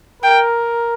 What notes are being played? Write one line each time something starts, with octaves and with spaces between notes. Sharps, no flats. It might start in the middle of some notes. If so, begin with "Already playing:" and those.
A#4 G5